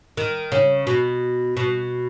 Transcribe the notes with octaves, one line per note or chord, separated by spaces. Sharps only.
D#3
C#3
B2
B2